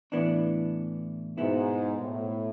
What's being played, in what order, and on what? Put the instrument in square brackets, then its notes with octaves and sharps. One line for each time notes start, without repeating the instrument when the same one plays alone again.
[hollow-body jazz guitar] A2 E3 B3 D4
[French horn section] G#2 [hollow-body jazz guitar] B2 B3 E4
[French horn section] A2